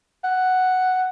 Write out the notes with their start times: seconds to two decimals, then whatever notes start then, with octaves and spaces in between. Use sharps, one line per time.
0.24 F#5